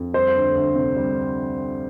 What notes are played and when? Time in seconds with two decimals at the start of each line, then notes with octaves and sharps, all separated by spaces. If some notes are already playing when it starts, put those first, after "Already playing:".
Already playing: F2
0.14 G3 C5
0.35 D2
0.55 D2
0.75 C3
0.96 G3